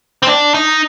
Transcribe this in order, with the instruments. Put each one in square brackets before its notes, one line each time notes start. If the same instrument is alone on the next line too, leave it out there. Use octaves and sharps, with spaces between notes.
[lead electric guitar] C4
D4
D#4